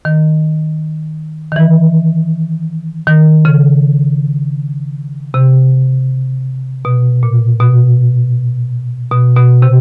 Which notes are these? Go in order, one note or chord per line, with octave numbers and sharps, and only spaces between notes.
D#3
D#3
E3
D#3
C#3
C3
B2
A#2
B2
B2
B2
C3